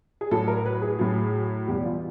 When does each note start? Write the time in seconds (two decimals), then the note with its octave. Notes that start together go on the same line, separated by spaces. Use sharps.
0.21 G#4
0.31 A2 F#3 A4
0.48 A#4
0.66 B4
0.82 G#4
0.99 A2 F#3
1.67 E2 B2 G3 G4
1.85 F4